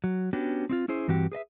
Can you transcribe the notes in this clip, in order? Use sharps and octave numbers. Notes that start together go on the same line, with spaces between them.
F#3
B3 C#4 D4 F#4 G4
C4 D#4 F4
C#4 E4 G#4 C5
G2 E3 C4 F#4 G4
G#4 B4 D#5 E5